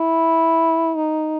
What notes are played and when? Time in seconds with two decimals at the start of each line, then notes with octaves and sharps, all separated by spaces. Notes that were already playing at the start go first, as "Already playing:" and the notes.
Already playing: E4
0.96 D#4